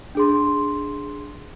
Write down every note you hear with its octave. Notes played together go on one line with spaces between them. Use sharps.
D4 G#4 C6